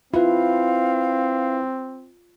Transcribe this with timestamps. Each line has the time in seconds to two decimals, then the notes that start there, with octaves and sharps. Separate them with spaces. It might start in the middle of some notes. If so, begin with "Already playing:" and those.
0.14 C4 E4 F4 B4 F5